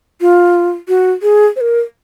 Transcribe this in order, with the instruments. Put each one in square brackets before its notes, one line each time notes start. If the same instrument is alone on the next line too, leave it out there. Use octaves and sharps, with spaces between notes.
[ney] F4
F#4
G#4
C5
A#4